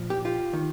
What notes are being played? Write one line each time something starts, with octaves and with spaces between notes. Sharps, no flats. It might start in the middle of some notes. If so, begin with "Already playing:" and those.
Already playing: A#2 F3
G4
F4 G4
D#3